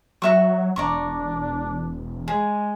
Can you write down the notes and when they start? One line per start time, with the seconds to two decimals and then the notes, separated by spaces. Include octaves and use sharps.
0.22 F#3 F#4 E5 C#6
0.76 E1 D4 D5 A#5 C#6
2.28 G#3 G#4